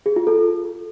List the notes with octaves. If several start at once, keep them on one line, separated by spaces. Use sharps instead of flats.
G#4
F4
A4